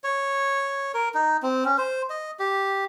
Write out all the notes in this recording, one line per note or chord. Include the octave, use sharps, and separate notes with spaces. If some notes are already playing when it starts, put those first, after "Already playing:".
C#5
A#4
D#4
C4
C#4
C5
D#5
G4